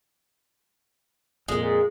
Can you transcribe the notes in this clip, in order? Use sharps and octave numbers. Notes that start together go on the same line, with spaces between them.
F2 A#2 G#3